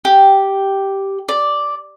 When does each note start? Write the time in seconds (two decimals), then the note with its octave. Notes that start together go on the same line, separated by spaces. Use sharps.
0.05 G4
1.29 D5